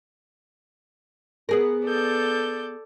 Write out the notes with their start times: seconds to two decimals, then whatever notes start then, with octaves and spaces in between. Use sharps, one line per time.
1.49 B3 G#4 A#4
1.86 A4 D5 G6